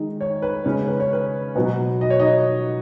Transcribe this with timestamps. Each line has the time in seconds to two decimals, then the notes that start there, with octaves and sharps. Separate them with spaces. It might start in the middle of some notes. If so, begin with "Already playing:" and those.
Already playing: D#3 G#3 D#4
0.21 C#5
0.42 B4
0.65 C#3 G#3 C#4 C#5
0.88 B4
1.00 C#5
1.13 B4
1.55 B2 F#3 B3 D#4
2.01 D#5
2.10 C#5
2.20 D#4 D#5